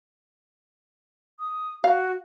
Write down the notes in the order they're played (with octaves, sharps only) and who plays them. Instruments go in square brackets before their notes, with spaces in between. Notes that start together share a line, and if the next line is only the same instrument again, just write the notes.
[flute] D#6
[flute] F#4 [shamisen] F5